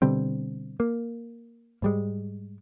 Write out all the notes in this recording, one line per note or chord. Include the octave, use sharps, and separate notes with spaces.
B2 D3 G3 C4
A#3
G#2 G3 G#3